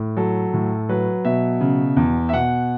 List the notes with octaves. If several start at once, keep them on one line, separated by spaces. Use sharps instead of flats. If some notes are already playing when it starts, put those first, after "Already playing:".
Already playing: A2
F#3 A4
A2
F#3 B4
B2 E5
C#3
E2
E5
B2 F#5